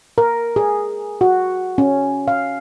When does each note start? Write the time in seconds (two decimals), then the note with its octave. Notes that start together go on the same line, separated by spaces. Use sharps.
0.18 A#4
0.56 G#4
1.21 F#4
1.78 C#4
2.28 F5